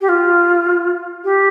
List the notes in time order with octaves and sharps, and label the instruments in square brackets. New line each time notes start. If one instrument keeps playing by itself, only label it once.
[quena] G4
F4
G4